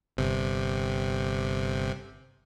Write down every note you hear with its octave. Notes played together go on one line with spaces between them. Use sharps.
G1 C3